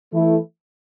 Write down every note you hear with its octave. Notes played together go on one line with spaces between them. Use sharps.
E3 A3 E4